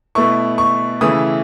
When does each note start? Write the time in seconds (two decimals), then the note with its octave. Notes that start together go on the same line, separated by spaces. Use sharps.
0.15 B2 A3 E4 C#6
0.58 C#6
1.01 C#3 E3 A3 E4 D#6